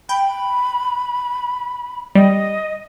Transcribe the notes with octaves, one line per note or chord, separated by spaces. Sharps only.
G5 B5
G3 D#5